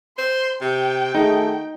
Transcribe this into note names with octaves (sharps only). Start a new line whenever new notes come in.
C5 C6
C3 G5
D#3 A3 D#4 F#4 G#4